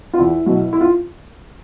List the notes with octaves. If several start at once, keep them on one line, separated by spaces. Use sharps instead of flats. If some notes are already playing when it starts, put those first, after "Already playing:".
F4
E2 E4
B2 F#3
E4
F4